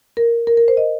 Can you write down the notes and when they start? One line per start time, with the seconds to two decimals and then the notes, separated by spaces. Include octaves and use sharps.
0.17 A#4
0.47 A#4
0.57 A#4
0.68 C5
0.77 D#5